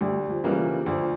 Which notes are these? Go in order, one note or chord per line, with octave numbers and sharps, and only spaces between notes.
D2 G3
F3
C#3 E3 G3 A#3
F3
D2 F3